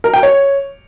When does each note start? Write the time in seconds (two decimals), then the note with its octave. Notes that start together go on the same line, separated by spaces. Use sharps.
0.04 A#4
0.14 G5
0.23 C#5